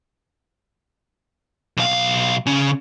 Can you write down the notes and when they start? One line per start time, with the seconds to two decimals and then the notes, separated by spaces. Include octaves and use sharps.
1.77 B1 F5
2.46 C#3 C#4